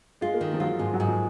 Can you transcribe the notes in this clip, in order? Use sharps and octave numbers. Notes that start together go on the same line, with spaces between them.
G#3 F4
A#3
D#3 G#3
F3
F#3 F4
G#2 F3
F#3
G#2
F3